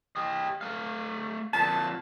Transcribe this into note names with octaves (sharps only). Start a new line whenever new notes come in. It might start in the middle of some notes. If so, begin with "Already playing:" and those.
G4 D#5
A3 F5
F2 A#2 A5